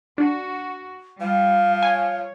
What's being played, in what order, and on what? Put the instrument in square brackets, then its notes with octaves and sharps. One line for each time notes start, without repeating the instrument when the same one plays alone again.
[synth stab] D4 [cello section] F#4
[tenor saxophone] F3 [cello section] G3 [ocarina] F5
[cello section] C#5 [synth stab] G#5